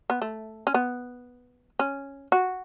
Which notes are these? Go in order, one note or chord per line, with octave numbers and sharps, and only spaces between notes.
B3
A3
C#4
B3
C#4
F#4